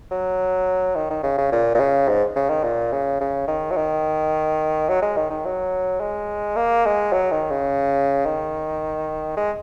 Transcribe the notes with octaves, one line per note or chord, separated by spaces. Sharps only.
F#3
D#3
D#3
C#3
C#3
A#2
A#2
C#3
G#2
C#3
D#3
A#2
C#3
C#3
D#3
F#3
D#3
F#3
G#3
D#3
D#3
F#3
G#3
A#3
G#3
F#3
D#3
C#3
D#3
G#3